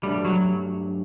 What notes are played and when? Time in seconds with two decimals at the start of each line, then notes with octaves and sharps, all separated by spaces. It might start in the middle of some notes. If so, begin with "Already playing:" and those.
0.02 G2 F#3 G3 A3 D4 G4
0.25 F#3